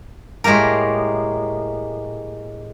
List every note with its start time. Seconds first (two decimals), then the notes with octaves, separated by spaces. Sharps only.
0.44 A2 G#3 A#3 G4 A#4